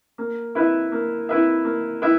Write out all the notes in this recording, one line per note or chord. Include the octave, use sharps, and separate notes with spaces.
A#3
E4 B4 E5
A#3
E4 B4 E5
A#3
E4 B4 E5